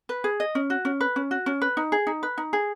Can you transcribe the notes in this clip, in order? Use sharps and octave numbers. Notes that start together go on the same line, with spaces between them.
B4
G#4
D#5
C#4
F#4
C#4
B4
C#4
F#4
C#4
B4
D#4
G#4
D#4
B4
D#4
G#4